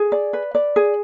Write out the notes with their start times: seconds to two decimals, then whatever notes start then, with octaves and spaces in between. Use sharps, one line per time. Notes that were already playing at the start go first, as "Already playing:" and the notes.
Already playing: G#4
0.12 D5
0.33 B4
0.55 D5
0.76 G#4